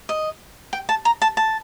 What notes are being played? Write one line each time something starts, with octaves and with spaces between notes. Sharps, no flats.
D#5
G5
A5
A#5
A5
A5